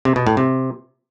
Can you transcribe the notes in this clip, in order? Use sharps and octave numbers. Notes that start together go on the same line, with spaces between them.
C3
B2
A2
C3